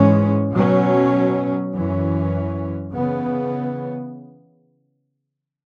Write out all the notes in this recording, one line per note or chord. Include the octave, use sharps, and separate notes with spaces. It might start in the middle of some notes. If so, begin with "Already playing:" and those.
Already playing: G#2 E3 G#3 C#4
B2 F#3 C#4
F#2 E3 C#4
C#3 E3 B3